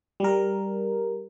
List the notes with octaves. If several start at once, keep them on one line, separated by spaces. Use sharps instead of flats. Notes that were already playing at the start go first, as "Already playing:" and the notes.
G3 A#4